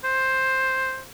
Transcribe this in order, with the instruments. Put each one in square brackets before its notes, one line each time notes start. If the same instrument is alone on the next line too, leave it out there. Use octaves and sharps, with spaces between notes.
[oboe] C5